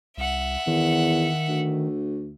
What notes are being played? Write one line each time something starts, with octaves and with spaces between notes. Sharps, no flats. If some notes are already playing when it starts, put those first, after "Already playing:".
C2 E5 F#5
E2 D#3
D2